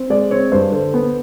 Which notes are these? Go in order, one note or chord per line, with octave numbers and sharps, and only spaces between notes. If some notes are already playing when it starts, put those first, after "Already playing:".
Already playing: C4
G#3 D5
C4 C#5
G2 C5
D3 C5
B3